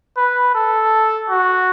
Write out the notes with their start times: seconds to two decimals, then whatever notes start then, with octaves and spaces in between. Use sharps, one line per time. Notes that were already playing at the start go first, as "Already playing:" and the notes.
0.17 B4
0.55 A4
1.30 F#4